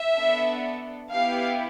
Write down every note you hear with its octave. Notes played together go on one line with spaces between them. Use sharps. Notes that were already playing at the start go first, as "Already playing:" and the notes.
Already playing: E5
B3 D4 A4
B3 E4 G4 F5